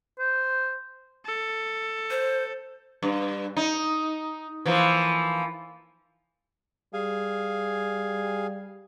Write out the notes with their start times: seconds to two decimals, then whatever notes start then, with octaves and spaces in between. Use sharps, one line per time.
0.19 C5
1.26 A4
2.10 C5
3.03 G2
3.57 D#4
4.66 E3 F3 A#3
6.94 G3 G#4 F5 G#5